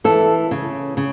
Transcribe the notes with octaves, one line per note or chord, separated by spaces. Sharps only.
E3 A4
C#3
C#3